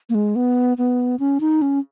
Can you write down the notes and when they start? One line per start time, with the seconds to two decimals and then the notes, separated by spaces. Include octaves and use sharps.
0.09 A#3
0.15 G#3
0.36 B3
0.78 B3
1.19 C#4
1.40 D#4
1.62 C#4